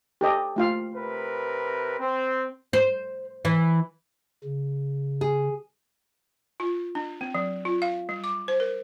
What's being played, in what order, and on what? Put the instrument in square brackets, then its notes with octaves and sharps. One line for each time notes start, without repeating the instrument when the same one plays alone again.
[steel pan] G4 A4 D#5
A3 F4 F5
[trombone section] C3 A#4 B4
C4
[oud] C5
E3
[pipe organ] C#3
[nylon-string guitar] G#4
[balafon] F4
D4
C4
F#3
F4
F5
G3
D6
C5
A#4